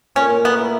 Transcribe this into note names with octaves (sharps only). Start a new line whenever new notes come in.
A#2 C#4
A#2
A#3 B3
E4